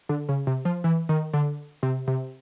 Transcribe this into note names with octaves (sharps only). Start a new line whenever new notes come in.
D3
C#3
C3
F3
E3
D#3
D3
C3
C3